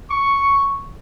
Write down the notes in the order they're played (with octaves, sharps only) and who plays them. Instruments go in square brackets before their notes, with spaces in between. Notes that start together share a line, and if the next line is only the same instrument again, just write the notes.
[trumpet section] C#6